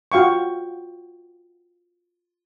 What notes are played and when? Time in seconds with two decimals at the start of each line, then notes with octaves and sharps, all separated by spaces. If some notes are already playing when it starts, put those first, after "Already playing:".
0.12 F4 F#4 F5 G5 C#6